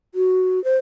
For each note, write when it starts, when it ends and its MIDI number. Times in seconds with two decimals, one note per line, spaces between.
0.15 0.62 66
0.64 0.77 72